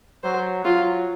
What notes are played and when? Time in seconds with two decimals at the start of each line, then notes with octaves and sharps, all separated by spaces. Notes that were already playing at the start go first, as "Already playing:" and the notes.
0.24 F#3 C5
0.65 F#3 F4